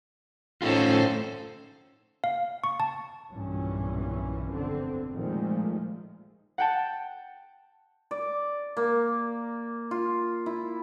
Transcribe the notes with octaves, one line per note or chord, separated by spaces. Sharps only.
A2 C#4 D#4 F4 A4 C5
F5
C#6
A5
B1 G2 A#2 E3 C#4
F1 B2 D3 C4
A#2 D#3 F3 G#3 A3
F#5 G5 A5
D5
A#3
F4
E4